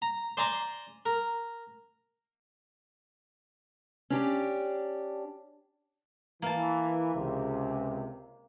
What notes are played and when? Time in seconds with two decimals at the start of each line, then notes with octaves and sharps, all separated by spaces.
0.02 A#5
0.37 C5 D5 G#5 A#5 C6 D6
1.06 A#4
4.10 C#4 D4 G4
6.42 E3 A#3 A5
7.15 C#2 C3